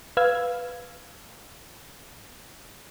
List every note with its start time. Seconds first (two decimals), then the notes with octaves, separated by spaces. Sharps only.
0.17 B4 F5 E6 G#6